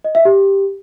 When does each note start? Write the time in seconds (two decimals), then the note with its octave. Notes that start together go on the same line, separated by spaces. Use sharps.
0.04 D#5
0.15 E5
0.25 G4